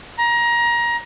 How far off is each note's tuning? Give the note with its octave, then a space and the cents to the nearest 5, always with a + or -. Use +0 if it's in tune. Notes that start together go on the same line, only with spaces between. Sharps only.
A#5 +25